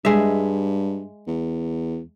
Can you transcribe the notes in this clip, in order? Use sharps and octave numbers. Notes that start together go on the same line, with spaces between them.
G2 G#3 E5
E2